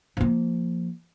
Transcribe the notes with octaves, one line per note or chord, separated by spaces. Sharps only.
F3 A#3